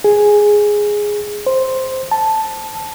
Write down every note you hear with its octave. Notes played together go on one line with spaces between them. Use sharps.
G#4
C5
A5